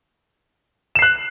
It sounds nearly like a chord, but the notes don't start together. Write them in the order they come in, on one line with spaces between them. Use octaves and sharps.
E7 C7 F#6